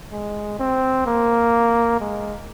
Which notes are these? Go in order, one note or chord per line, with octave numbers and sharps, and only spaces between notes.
G#3
C4
A#3
G#3